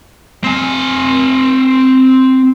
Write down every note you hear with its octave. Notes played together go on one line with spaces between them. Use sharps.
C4 G#5